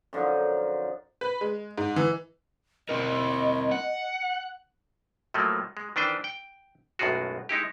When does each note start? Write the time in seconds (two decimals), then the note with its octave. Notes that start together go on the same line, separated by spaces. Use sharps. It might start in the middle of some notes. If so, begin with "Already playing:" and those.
0.13 F#2 D3 F3 D#4
1.21 B4
1.41 G#3
1.78 G#2
1.96 E3
2.89 C4 E4 A#4 D#5
3.71 F#5
5.34 A2 F3 F#3 A3 A#3
5.77 G#3
5.96 D#3 E3 D4 B4 C5 G5
6.24 G5
6.99 B1 F#2 A2 G#3 F4 F#4
7.49 G#3 D#4 E4 G4